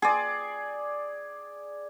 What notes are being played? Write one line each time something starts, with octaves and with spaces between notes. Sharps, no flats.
G#4 D5